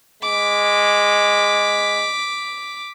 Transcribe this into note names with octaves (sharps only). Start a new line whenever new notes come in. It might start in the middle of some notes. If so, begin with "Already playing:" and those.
G#3 D6 B6